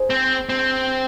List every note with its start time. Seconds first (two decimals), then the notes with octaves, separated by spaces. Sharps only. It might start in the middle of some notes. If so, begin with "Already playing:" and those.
Already playing: D#4 G#4 C5
0.10 C4
0.49 G#3 C4 D4 G#4 D#5